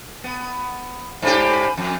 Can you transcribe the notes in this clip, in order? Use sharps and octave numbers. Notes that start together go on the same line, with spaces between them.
B3
G#2 D4 G4 C5 G#5 B5
F2